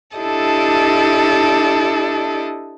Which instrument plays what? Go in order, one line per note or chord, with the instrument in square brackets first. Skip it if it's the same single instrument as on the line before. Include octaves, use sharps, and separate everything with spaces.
[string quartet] D4 E4 G4 A4 D#5